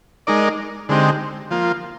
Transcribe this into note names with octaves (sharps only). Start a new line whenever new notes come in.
G#3 D#4 A#4 D5
D3 G#3 C4 D#4 G4
F3 A#3 F4